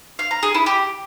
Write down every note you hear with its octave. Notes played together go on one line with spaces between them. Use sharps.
F5
A#5
G#4
E4
G4